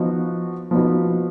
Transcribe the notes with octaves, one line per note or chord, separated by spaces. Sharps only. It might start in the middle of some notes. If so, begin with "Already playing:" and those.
Already playing: F3 B3 D#4 F#4
F3 B3 D#4 F#4